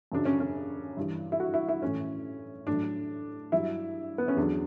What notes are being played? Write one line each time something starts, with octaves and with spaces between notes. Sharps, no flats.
F#2 C#3 F#3 D4
C#4
C#4
G2 E3
E4
F#4
E4
E4
A2 E3 C#4
A2 F#3 D4
G2 F#3 E4
B3
C#4
E2 D3 F#3 D4